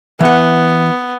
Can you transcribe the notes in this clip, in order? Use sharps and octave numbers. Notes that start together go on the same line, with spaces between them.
E3 B3 F#5